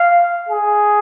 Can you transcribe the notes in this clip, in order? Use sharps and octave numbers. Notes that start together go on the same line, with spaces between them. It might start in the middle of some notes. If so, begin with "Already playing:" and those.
Already playing: F5
G#4